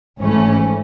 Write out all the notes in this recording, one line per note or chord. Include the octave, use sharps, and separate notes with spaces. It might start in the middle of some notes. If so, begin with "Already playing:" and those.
G#1 G#2 E3 A3 C#4